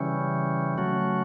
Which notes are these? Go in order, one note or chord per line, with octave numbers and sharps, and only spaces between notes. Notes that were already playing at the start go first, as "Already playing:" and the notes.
Already playing: C#3 E3 G3 C#4
C#3 F#3 A3 C#4 F#4